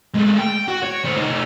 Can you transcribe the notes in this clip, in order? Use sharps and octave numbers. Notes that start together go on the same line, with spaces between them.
G#3 A3
G5
F#4
C#5
A3 C5
A3 D#4